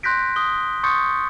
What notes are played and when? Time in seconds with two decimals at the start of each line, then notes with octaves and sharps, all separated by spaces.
0.03 C6 F#6 G6 A#6 B6 D7
0.36 D#6 G7
0.84 C6 C#6 D#6 G6 A6 C#7